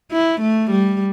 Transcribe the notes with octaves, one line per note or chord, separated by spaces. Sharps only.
E4
A3
G3